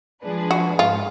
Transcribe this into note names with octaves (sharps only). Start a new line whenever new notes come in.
F3 G#3 D4 G#4 B4
F#4
G#2 F4